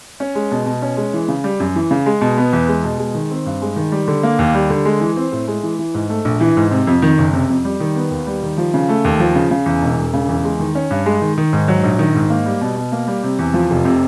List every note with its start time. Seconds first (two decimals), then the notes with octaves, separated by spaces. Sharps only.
0.20 C#4
0.35 G#3
0.51 B2
0.66 B2
0.82 C#4
0.97 G#3
1.13 E3
1.28 C#3
1.44 G3
1.60 F#2
1.75 E3
1.91 C#3
2.06 G#3
2.21 B2
2.37 B3
2.53 E2
2.68 G#3
2.84 B2
2.99 G#3
3.15 D#3
3.31 C4
3.46 G2
3.62 G#3
3.76 D#3
3.92 G3
4.08 D3
4.23 A#3
4.39 D#2
4.54 G3
4.70 D3
4.85 G#3
5.01 E3
5.16 C4
5.32 A2
5.48 G#3
5.63 E3
5.79 E3
5.94 G#2
6.09 A3
6.25 A#1
6.40 E3
6.57 G#2
6.71 C3
6.87 F2
7.02 D#3
7.18 F#1
7.33 C3
7.49 F2
7.65 G3
7.80 D#3
7.96 B3
8.11 D#2
8.27 G3
8.43 D#3
8.58 F3
8.74 C#3
8.89 A3
9.05 D#2
9.20 F3
9.35 C#3
9.51 C#3
9.66 E2
9.82 E1
9.98 E1
10.13 C#3
10.29 E2
10.44 G#3
10.59 D#3
10.75 C#4
10.91 G2
11.06 G#3
11.21 D#3
11.38 D#3
11.53 G#2
11.68 F#3
11.84 A#1
11.99 D#3
12.15 G#2
12.30 A#3
12.46 G3
12.61 B2
12.77 B2
12.92 A#3
13.07 G3
13.23 C3
13.39 E2
13.54 F3
13.70 F1
13.85 C3